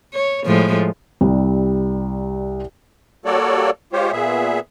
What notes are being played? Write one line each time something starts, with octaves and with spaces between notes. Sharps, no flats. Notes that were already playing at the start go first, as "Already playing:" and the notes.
C#5
A2 F3 G#3
C2 G3
G3 A#3 F#4 A4 C#5 D5
G#3 F4 G4 C5 C#5
A#2 B3 G#4 E5